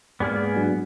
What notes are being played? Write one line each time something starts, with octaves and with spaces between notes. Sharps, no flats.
G#2 A#3 B3 G#4 D5 F6
F#3 D4